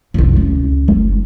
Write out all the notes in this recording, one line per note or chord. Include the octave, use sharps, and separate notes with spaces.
C2 F2
C#2
F#1